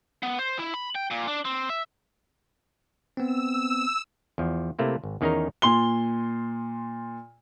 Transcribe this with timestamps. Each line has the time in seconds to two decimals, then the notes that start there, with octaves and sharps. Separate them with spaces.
0.23 B3
0.39 C5
0.59 E4
0.74 B5
0.95 G5
1.11 A#2
1.27 D4
1.45 C4
1.69 E5
3.17 B3 C4 E6
4.38 E2 F3
4.79 C3 A3 A#3 E4
5.04 G#1
5.21 E2 D#3 C#4 D#4 G#4 A#4
5.62 A#2 C6 G7